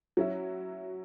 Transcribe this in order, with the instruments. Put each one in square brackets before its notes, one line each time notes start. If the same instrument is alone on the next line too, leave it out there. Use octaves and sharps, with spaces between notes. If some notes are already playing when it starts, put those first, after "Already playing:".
[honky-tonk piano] F#3 C#4 E4